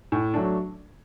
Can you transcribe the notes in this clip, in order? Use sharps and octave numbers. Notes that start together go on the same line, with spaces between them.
A2
F#3 A3 D4